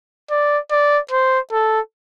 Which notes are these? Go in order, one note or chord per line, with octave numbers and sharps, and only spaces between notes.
D5
D5
C5
A4